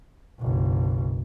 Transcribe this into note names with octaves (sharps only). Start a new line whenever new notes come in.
F#1 B1